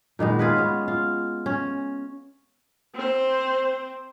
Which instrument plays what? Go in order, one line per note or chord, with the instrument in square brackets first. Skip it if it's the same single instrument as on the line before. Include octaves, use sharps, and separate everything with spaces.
[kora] A#2 D#3 G#3 B3
F4 G#4 B4
B3 C#4
F4
C#4
[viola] C4 C5